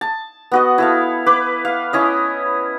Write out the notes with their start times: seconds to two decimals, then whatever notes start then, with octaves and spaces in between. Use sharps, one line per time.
0.01 A5
0.51 B3 F#4 D#5
0.78 E4 A4 F5
1.26 B4 D6
1.65 F5
1.93 C#4 E4 D#5